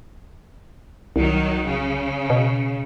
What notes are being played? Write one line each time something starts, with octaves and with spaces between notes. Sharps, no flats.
C2 D#3 F#3
C#3
B2